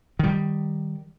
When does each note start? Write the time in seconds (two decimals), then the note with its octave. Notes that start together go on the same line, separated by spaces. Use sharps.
0.19 D#3 G3